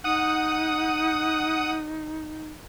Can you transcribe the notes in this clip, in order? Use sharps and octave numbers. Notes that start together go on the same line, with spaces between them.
D#4 F#5 D#6